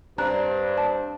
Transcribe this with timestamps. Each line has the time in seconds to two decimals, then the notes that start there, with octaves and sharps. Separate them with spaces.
0.18 G2 C4 D4 A#5 F#6
0.78 A5